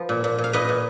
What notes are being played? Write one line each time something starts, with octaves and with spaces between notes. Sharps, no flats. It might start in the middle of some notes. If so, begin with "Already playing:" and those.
Already playing: F3 B4
A#2
A#2
A#2
F5
A#2 B4 D#5
A#2